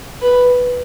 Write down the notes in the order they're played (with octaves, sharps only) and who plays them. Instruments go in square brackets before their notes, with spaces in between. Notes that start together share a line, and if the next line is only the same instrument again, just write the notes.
[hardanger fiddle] B4